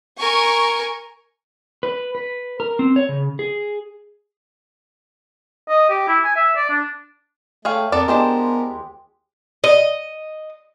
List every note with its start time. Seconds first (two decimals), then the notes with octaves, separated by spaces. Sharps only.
0.19 A#4 G#5 C#6
1.83 B4
2.15 B4
2.60 A#4
2.79 C4
2.96 C#5
3.09 C#3
3.39 G#4
5.69 D#5
5.90 G4
6.08 E4
6.24 G#5
6.36 E5
6.56 D5
6.70 D4
7.65 A3 G#4 C#5 F5 G5 D#6
7.92 F2 B3 A4 A#4 D5
8.08 G#3 B3 D4 E4 G4 C5 D#5
8.68 D#2
9.64 D#5